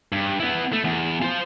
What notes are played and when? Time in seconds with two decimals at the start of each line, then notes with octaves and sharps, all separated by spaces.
0.12 G2
0.40 B3 E4
0.73 A3
0.84 E2
1.22 F4 C5